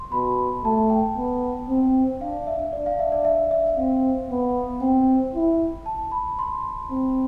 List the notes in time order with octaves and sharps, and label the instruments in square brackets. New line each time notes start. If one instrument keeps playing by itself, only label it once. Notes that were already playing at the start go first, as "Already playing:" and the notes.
Already playing: [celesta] C6
[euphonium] B2 [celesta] B5
[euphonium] A3 [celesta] A5
[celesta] G5
[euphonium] B3
C4
[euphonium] D4 [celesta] F5
[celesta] E5
[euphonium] D4 [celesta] D5
[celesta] F5
E5
D5
E5
E5
[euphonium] C4 [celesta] F5
[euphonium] B3
[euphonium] C4 [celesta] G5
[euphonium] E4
[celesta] A5
B5
C6
[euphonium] C4